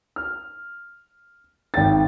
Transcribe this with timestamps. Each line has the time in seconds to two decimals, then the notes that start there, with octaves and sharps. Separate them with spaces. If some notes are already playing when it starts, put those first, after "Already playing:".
0.16 F6
1.74 G#1 G5 A6